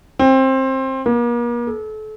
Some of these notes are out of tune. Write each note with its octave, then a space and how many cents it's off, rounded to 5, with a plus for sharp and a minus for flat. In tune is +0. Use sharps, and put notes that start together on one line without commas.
C4 +20
A#3 +40
A4 -35